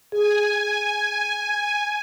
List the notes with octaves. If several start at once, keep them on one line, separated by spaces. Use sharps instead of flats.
G#4 G#5